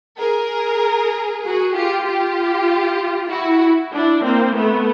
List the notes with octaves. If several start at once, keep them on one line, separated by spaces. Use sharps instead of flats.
G#4 A#4
F#4 G#4
F4 G4
F4 G4
E4 F#4
D4 E4
A#3 C4
A3 B3